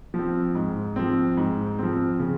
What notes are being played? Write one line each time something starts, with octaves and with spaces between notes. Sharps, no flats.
F3 C4
G#2
F3 C4
G#2
F3 C4
C#3